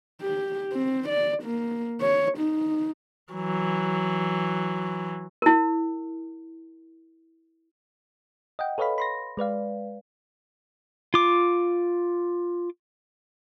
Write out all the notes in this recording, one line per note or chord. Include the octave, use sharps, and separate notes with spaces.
G4
C4
D5
A#3
C#5
D#4
E3 F#3
E4 A#4
D#5 F#5 G5
A4 B4 C#5 D#5 F5 B5
B5 C6 A#6
G#3 B4 D5 F5
F4 D6